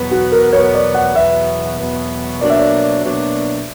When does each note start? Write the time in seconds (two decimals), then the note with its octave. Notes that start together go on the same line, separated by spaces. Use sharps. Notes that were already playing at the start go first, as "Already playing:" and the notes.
Already playing: E2 B2 F#3 B3
0.11 F#4
0.32 A#4
0.53 E2 B2 F#3 B3 C#5
0.74 D5
0.94 F#5
1.15 E2 B2 F#3 B3 E5
1.79 E2 B2 F#3 B3
2.41 B2 F#3 A#3 D4 D5
2.50 E5
2.58 D5
3.03 B2 F#3 A#3 D4